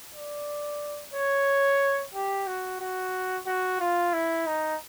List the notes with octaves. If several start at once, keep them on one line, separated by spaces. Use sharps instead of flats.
D5
C#5
G4
F#4
F#4
F#4
F4
E4
D#4